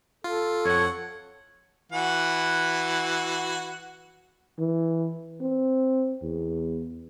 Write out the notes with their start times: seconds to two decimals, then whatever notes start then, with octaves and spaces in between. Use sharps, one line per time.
0.24 F4 A4
0.65 F2 C#5 F#5
1.92 E3 F#4 F#5
4.59 E3
5.41 C4
6.22 E2